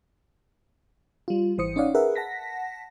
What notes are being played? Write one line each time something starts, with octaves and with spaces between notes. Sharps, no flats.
G3 F4
G#1 E3 C5 D#6 C#7
C#4 D#4 C#5 D5 F5 F#5
G#4 A#4 B4 E5 F#5
F#5 A5 A#6 B6